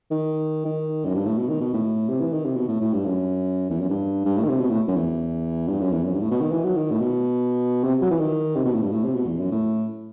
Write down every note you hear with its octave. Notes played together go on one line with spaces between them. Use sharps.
D#3
D#3
F#2
G2
A2
B2
D#3
B2
A2
C3
E3
D#3
C3
B2
A2
A2
G2
F#2
E2
F#2
G2
G2
A2
D#3
C3
B2
A2
F#2
E2
G2
F#2
E2
F#2
G2
A2
B2
D#3
E3
F#3
D#3
A2
B2
C3
F#3
E3
D#3
C3
B2
A2
G2
A2
C3
B2
E2
F#2
A2